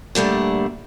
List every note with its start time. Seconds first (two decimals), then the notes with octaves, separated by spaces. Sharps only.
0.15 A#2 D3 G3 A3